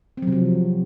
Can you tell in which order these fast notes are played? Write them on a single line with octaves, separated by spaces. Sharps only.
C4 F#3 C3 F3